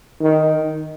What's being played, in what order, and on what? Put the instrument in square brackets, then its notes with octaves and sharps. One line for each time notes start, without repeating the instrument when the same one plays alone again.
[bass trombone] D#3